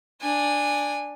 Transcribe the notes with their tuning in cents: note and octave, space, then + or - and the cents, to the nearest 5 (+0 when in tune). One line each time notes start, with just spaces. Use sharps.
D4 +0 G#5 -10